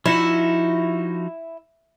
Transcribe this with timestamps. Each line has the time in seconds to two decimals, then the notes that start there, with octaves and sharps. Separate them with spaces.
0.06 F3 D#4 E4 F#4